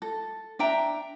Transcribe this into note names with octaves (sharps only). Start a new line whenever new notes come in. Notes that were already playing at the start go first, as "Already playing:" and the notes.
A4
D4 E5 G5 A#5